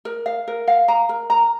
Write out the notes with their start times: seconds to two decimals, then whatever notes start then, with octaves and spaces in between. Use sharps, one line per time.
0.05 A#4
0.26 F5
0.48 A#4
0.68 F5
0.88 A#5
1.09 A#4
1.30 A#5